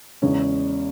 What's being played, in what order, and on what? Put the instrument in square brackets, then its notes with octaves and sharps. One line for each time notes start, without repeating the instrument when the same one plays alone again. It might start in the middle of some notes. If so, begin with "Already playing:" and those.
[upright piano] E2 C#3 G#3 C#4